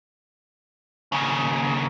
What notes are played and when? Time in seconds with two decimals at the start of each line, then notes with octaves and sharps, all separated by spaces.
1.12 D#2 C#3